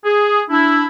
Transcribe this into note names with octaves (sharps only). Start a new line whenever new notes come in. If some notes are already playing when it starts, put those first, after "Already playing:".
G#4
D4 E4